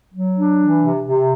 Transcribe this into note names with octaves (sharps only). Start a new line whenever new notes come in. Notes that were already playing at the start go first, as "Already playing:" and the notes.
F#3
D4
E3
C3
C3